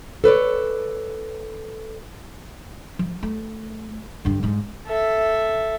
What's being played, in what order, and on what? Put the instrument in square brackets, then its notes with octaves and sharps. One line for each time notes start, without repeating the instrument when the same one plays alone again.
[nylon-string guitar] A4 B4 C#5 D5
[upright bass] F3
A3
G2 D3
G#2 G#3
[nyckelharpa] A4 E5